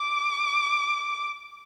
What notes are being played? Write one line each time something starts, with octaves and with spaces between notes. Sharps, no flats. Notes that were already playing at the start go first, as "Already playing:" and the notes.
Already playing: D6